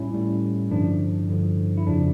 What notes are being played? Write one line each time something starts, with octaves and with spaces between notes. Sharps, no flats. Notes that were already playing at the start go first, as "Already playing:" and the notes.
Already playing: A2 G3 C#4 E4
A2 G3
G2 D3 F3 D4
G2 D3 F3
E4
F2 C#3 F3 D4